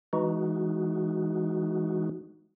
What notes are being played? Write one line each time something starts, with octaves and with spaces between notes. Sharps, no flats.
E3 G#3 D#4 F#4